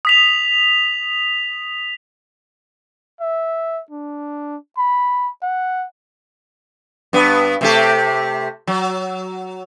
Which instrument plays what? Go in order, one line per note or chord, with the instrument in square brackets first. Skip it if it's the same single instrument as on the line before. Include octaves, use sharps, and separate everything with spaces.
[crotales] D#6 B6 F7
[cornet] E5
D4
B5
F#5
[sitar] G2 B3
C3 A3 G4
F#3